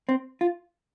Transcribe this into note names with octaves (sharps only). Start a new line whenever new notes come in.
C4
F4